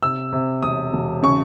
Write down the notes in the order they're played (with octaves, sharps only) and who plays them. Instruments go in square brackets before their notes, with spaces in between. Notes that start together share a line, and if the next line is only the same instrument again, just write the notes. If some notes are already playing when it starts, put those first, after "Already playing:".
[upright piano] C3 E6
C3
E1 D#6
E1
C#3 C#6